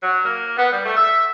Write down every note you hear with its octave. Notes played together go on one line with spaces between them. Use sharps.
F#3
A#3
B3
G3
A3
E5